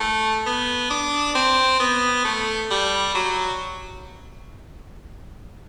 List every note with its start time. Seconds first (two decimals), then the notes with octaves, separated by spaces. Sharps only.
0.01 A3
0.46 B3
0.90 D4
1.35 C4
1.80 B3
2.25 A3
2.71 G3
3.15 F#3